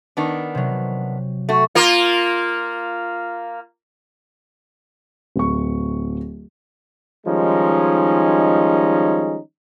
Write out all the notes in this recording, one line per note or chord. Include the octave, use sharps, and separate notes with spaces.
D#3 B3 D4
C3 F#3
A3 F#4
A#3 F4
D1 C#6
D#3 F3 G3 G#3 C#4 D#4